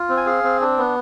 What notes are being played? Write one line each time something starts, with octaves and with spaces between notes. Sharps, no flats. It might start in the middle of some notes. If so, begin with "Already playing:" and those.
Already playing: F4
C4
G#5
G#4 F5
C4
D4
B3